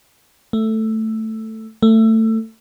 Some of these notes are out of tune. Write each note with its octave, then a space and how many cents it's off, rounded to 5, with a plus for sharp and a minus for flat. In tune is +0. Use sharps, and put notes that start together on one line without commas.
A3 +5
A3 +20